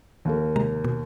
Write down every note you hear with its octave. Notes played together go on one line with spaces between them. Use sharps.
D#2 A#3 A#4
C3 G#3 A#5
B2